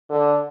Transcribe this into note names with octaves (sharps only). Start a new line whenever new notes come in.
D3